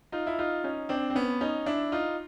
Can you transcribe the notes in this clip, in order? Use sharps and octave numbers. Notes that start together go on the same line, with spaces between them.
D#4 F4
E4
D#4 F4
C#4 D#4
C4 D4
C4
B3 C#4
C#4 D#4
D4 E4
D#4 F4